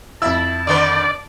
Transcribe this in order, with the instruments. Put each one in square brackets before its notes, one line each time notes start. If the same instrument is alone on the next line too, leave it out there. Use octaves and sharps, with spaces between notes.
[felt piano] F2 E5 E6 [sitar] E4 [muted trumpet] A5
[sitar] D3 D#3 B4 [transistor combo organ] D5